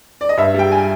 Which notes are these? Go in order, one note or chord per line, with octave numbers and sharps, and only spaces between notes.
D5
D#5
G2 E5
G3 G5
G#5